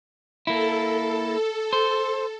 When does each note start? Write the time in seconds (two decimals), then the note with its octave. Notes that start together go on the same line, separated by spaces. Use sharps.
0.47 A#3 E4 A4
1.73 C5